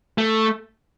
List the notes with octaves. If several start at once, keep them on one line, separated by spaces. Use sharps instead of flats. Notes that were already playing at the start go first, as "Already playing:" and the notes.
A3